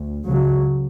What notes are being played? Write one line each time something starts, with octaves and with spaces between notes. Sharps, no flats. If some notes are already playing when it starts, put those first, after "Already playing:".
Already playing: D2
C#2 C#3 F#3